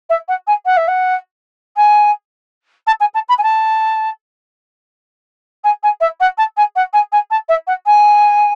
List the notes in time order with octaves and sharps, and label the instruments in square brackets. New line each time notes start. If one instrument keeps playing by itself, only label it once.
[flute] E5
F#5
G#5
F#5
E5
F#5
G#5
A5
G#5
A5
B5
G#5
A5
G#5
G#5
E5
F#5
A5
G#5
F#5
G#5
G#5
A5
E5
F#5
G#5